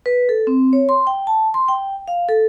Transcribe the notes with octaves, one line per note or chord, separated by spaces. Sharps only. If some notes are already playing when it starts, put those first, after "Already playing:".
B4
A4
C4
C#5
C6
G5
A5
C6
G5
F5
A4